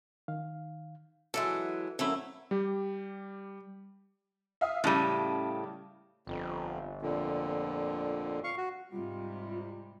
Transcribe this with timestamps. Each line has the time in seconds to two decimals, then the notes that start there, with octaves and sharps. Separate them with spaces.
0.28 D#3 F5
1.34 E3 F#3 G#3 A4 E5 A5
1.99 F#3 A3 A#3 C4 C#4 E4 B5
2.51 G3 G4
4.61 E5 F5 D#6
4.84 A2 C#3 G3 A5 D#7
6.27 G1 F2
7.02 F2 A#2 D3
8.44 F5 C#6
8.57 F#4
8.92 G#2 C3 G3 F4